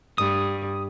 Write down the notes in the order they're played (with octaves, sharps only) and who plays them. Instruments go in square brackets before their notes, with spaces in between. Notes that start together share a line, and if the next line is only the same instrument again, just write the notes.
[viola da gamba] G2 [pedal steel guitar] D#6